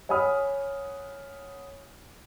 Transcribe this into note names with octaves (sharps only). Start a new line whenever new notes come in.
C#5 F#5 G#5 B5 D#6 F6